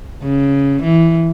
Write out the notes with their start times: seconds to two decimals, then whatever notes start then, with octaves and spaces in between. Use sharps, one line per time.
0.22 C#3
0.83 E3